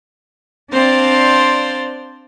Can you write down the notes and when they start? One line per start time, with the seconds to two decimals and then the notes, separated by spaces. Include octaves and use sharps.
0.72 C4 D4 C5 D5 F5